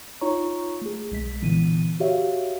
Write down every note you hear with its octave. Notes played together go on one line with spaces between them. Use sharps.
D#4 F4 C#5 A#5 C#6
A3 G#4
B1 G#3 B6
A#2 D3 E3 B3 D#7
F#4 G4 C#5 E5 F5